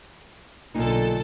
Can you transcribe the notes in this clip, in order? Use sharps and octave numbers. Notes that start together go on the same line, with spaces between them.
B1 A#2 D3 D#4 A4